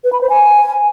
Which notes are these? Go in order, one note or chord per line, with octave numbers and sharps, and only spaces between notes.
B4
B5
C5
G#5